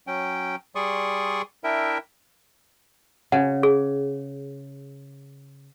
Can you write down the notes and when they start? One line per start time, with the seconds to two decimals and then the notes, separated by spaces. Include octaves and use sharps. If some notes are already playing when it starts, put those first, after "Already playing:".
0.07 F#3 C#4 G5
0.75 G3 G#4 D5 C6 C#6 D#6
1.64 D4 E4 A#4 E5 G5
3.32 C#3 F#5
3.63 G#4